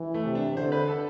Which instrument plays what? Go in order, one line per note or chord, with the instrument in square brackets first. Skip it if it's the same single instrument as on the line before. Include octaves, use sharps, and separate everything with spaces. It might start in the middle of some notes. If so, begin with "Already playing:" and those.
Already playing: [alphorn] E3
[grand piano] A3
[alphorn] C3
[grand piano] D4
[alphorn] D3 [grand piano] C5
[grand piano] B4
A4